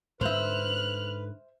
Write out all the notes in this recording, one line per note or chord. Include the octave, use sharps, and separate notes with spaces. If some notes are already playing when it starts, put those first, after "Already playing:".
G#2 D3 B4 C5 E5 F6 F#6